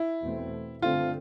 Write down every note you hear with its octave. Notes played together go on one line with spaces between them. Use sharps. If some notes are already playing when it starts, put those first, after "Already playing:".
Already playing: E4
E2 B2 A3 C4
G2 D3 A3 C4 F4